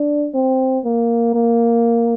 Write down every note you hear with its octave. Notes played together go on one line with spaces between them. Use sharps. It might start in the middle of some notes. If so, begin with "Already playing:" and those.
Already playing: D4
C4
A#3
A#3